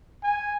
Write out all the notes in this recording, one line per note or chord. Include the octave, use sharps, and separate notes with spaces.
G#5